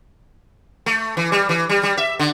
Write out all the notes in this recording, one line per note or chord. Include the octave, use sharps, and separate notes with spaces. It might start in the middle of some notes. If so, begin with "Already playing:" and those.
A3
E3
G3
E3
G3
G3
E5
D3